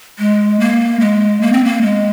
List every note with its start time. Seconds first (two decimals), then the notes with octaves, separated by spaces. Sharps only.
0.19 G#3
0.60 A#3
1.00 G#3
1.41 A#3
1.52 C4
1.65 A#3
1.82 G#3